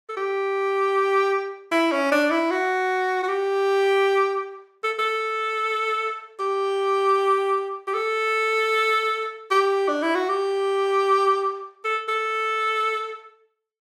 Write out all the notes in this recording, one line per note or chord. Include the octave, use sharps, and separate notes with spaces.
A4
G4
E4
C#4
D4
E4
F#4
F#4
G4
A4
A4
G4
G4
A4
G4
D4
E4
F#4
G4
A4
A4